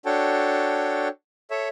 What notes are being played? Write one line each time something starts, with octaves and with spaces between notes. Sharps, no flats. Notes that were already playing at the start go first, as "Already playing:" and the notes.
D4 F#4 A4 C#5 G5 A5
A4 C#5 E5